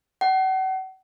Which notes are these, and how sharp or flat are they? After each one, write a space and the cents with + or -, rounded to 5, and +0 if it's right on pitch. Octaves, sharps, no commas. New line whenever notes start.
F#5 +40